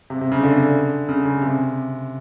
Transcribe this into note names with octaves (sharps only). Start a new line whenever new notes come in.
C3
C3
C#3
D3
C#3
C#3
C3